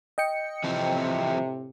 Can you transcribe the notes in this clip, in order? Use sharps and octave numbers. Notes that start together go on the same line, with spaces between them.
D#5 G5 C#7
A2 C3 E3 F3 C4